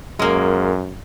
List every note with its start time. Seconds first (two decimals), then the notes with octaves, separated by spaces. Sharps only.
0.19 F#2 G#3 A#3